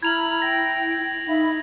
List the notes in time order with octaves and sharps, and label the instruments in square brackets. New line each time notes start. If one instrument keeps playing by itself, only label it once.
[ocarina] E4 [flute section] A#5 B5 F6 [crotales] G#6 F7 F#7
[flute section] G5 [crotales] A#6
[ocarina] D#4 [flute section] E5 F5 B5